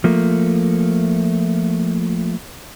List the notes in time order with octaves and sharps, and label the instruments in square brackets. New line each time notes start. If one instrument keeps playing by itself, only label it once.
[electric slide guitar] F3 A3 A#3